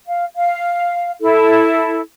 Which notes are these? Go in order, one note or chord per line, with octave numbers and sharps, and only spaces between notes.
F5
F5
E4 A4